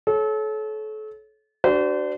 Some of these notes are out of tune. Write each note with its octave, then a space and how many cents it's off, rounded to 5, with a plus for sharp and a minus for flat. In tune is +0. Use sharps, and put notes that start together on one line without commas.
A4 -35 C#5 -10
D4 +0 F#4 +35 C5 -35